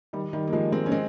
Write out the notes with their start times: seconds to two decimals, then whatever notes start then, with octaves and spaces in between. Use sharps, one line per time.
0.13 D#3 G3
0.33 D#3 G3
0.47 A#3
0.53 F3 G#3
0.72 G#3 C4
0.86 C#4
0.92 G#3 C4